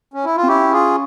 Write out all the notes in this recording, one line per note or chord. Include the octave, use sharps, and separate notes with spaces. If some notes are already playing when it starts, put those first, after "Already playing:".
C#4
E4
F4
C4
C#4 E4 G4
F4 G#4